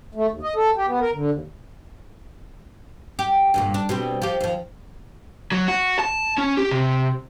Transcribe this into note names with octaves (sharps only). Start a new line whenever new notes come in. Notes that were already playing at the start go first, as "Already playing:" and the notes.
A3
D#2
D#5
A4
G4
B3
A#4
D3
D#2
G4
D2 G2 A#2
D4
B2 G3 C4
F3 G4
D#2 F3
F#3
F#4
A5
C#4
G4
C3